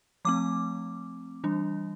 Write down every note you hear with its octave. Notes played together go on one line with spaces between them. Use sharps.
F3 A3 C4 D6
E3 G3 D4